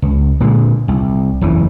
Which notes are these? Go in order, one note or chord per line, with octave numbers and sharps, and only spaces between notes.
C#2
A#2 D3 G#3
C2
F#1 E2 C#3 E3